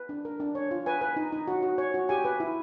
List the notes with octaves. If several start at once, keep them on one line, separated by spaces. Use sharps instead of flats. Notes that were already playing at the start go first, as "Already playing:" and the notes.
Already playing: B4
D4
A#4
D4
C#5
F4
B4 G#5
B4
D#4
D#4
F#4
F#4
C#5
F#4
G4 G#5
B4
E4